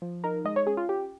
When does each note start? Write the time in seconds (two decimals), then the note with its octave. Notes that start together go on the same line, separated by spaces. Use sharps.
0.02 F3
0.24 D#4 A#4
0.45 G#3 D#5
0.56 C#5
0.67 C#4 G#4
0.77 F4
0.89 C#4 G4